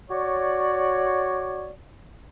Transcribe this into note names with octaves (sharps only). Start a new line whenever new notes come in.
F#4 C#5 D5